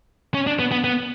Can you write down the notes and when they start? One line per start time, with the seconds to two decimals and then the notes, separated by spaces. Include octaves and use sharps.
0.34 C#4
0.47 D4
0.59 B3
0.71 B3
0.84 B3